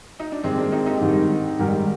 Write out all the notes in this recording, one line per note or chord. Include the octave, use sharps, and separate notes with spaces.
D#4
D4
G#2 D#3 G3 G#3 C4
A#3 D4
C4 D#4
D#4 G4
G#2 D#3 G3
G#2 D#3 G3 G4 A#4